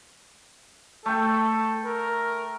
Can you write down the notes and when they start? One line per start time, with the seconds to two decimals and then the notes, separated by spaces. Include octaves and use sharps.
1.06 A3 A4 G5
1.86 A#4